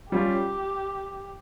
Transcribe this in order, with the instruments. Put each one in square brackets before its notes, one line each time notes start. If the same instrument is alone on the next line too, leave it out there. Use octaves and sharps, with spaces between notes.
[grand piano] G3 C#4 F4 [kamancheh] G4